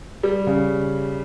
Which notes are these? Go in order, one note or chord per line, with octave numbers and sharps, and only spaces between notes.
G3
C#3